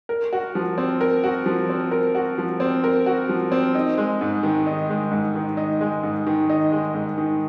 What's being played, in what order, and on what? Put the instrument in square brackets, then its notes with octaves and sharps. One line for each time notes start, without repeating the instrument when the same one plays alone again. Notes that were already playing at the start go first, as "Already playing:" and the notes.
[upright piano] A#4
F#4
F3
C4
A#4
F#4
F3
C4
A#4
F#4
F3
C4
A#4
F#4
F3
C4
D#4
G#3
G#2
D#3
D#4
G#3
G#2
D#3
D#4
G#3
G#2
D#3
D#4
G#3
G#2
D#3